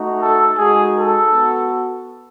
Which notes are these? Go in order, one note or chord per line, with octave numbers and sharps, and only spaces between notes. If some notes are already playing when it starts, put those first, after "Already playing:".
Already playing: A3 D#4 F#4
A4
G#3 D#4 F#4 G#4
A4
B3 F#4